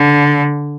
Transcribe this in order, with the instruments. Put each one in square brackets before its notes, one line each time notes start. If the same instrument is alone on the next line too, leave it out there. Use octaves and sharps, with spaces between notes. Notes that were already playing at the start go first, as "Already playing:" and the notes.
Already playing: [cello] D3